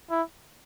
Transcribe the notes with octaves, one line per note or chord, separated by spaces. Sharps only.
E4